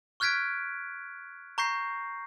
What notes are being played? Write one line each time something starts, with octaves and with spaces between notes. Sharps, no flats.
C#6 F6 F#6 G#6 B6 D7
A#5 C#6 G6 A#6 C7